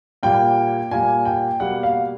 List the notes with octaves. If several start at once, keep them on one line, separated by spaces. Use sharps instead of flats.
A#2 G3 A#3 G5
A#2 G3 A#3 G#5
G5
B2 G3 A#3 F#5
F5